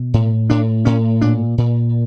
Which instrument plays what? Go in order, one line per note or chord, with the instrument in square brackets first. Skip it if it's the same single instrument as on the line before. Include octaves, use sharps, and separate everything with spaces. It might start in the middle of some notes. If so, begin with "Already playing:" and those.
Already playing: [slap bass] B2
A2
A2 D4
A2 C#4
A#2 D4
A#2